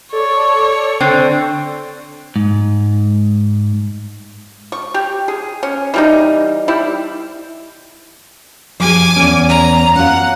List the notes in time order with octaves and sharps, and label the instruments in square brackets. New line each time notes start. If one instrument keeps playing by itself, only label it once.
[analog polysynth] A4 D5 [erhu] C#5
[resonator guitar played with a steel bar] D3 C4
[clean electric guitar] G#2
[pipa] C#6
G4
G#4
C#4
E3 G3 D#4
G3 E4
[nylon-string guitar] F3 G4 G#4 [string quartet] G#5 D6
[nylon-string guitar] E2 C#4
[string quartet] A#5
[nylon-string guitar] C#4 F4 [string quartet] F#5